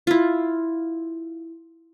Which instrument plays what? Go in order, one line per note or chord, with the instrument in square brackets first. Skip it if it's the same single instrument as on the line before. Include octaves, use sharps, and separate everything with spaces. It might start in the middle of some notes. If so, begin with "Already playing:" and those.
[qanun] E4 F4